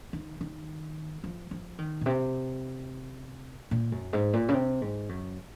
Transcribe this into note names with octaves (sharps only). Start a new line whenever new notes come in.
D#3
D#3
F3
F3
D#3
A#2
C3
A#2
F#2
G#2
A#2
C#3
C3
G#2
F#2